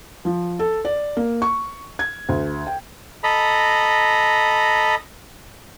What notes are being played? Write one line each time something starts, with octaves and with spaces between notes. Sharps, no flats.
F3
A4
D5
A#3
C#6
G#6
D2
G5
A4 D#5 A#5 B5